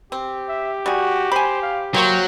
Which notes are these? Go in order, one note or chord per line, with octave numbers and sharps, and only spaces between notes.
C4 G4
E5
G3 F#4 G#4
C5 G#5 B5
F5
F#3 A#3 C5 G5 C#6